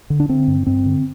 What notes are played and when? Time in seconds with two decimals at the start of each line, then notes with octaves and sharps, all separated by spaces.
0.10 D3
0.20 D4
0.29 D3 C4
0.48 G2
0.67 G2 C4
0.86 D3